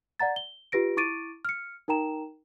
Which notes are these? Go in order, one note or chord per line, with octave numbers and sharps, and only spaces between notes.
D5 F#5 A#5 A6
G7
F4 G4 B4 A#6 D7
E4 C#6 D6 A6 D7 D#7
F6 C#7
D#4 A#4 G5 A#5 E7